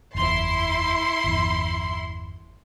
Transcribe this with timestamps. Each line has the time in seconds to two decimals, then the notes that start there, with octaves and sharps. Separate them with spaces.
0.15 F#1 E2 E4 C6
1.24 G1 E2